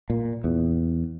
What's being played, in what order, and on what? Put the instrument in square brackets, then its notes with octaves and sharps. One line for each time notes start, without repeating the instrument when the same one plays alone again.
[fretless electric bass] A#2
E2